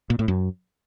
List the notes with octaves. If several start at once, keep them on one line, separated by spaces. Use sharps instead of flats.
A#2
A2
F#2